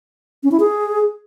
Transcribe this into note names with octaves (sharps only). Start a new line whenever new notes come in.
C#4
E4
G#4